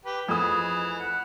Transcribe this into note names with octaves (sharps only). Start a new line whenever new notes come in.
G4 B4
F2 E3 A3 G#4 D#6
F#5